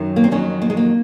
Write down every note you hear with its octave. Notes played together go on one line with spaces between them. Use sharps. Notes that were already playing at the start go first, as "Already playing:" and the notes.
Already playing: F#2 D#3 F#3
A#3
C4
F2 D#3 F#3 C#4
A#3
G#3
A#3